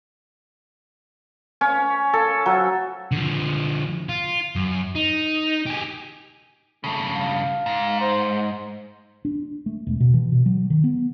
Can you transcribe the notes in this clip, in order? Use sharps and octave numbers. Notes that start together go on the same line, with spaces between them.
C#4
A4
F#3
D3 F3
F4
F#2
D#4
G4 G#4
G2 C#3 A3
F5
G#2
C5
D4
A3
E1
B2
E3
B2
F#3
D#3
B3